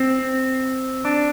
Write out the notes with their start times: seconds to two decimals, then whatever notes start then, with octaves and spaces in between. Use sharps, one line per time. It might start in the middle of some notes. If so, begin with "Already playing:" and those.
Already playing: C4
1.05 D4